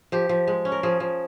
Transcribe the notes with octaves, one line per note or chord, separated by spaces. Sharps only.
F3 G4
F3
G#3
C#4
A#4
F3 G#4
F3